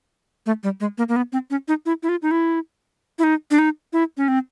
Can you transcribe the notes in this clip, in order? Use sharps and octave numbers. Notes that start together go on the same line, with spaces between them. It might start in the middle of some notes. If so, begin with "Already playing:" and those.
A3
G3
G#3
A#3
A#3
B3
C4
C#4
D#4
E4
E4
F4
D#4
E4
E4
D#4
D4
D#4
E4
C#4
C4